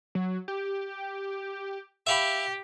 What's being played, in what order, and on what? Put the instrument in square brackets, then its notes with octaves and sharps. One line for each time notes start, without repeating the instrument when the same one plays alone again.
[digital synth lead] F#3
G4
[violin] G4 [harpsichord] E5 F5 B5